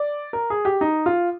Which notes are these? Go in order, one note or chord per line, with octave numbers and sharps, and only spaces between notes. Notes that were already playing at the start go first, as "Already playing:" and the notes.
Already playing: D5
A#4
G#4
G4
D#4
F4